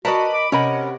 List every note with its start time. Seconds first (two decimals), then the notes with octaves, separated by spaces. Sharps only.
0.05 F#4 A#4 B4 D5 D#5 A5 B5
0.34 D6
0.52 C3 C#4 A#4 D#5 F#5 B5